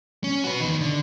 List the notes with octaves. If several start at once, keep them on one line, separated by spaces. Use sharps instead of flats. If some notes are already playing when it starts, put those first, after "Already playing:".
C#4
F#4 B4
E2 D#3
D3